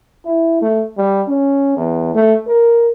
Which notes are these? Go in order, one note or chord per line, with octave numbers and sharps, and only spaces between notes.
E4
A3
G3
C#4
E2
A3
A#4